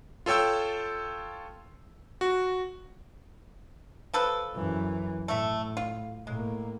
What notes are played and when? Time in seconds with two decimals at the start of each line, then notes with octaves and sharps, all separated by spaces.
0.26 F4 A4 C#5 G5 E6
2.21 F#4
4.14 F3 A4 B4
4.55 F#2 E3
5.28 A2 A3 E5
5.77 F4
6.27 A2 G#3 A#3